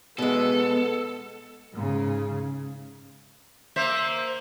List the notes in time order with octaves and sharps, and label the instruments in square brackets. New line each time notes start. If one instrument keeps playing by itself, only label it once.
[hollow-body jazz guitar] B2 G#3 [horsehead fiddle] B3 [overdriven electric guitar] A4 [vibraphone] B4 D#5
[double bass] G#2 C#3
[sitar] A#3 C5 E5